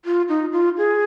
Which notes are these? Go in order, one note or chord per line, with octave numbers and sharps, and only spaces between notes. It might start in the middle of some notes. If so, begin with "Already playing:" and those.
F4
D#4
F4
G#4